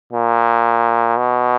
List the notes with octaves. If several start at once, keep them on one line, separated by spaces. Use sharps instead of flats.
A#2
B2